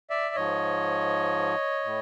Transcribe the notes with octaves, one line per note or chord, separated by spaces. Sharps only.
D5 E5
G#2 F3 C#5 D#5
A2